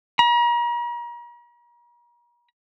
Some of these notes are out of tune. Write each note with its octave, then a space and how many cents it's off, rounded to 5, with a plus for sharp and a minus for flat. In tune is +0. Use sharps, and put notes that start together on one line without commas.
A#5 +40